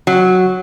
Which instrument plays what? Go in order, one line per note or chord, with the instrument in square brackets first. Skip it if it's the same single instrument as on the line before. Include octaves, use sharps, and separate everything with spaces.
[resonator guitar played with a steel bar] F#3